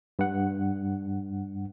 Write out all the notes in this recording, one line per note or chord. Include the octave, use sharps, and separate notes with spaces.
G2 F#5